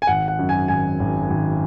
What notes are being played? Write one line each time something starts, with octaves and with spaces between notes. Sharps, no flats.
G#5
G#1 F#5
F#5
F#2
G#5
G#1 G#5
G#1
G#1